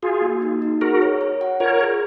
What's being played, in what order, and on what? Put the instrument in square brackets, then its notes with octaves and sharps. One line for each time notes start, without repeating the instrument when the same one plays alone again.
[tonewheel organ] F4 G#4 [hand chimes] F#4
[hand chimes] A#3
D#4
D#4
[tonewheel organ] F#4 A#4 [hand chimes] G#4
[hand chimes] C#5
C#5
F#5
[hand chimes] F4 [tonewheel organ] A#4 C#5
[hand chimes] G#4